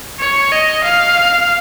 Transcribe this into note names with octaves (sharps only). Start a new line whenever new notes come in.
C#5
D#5
F5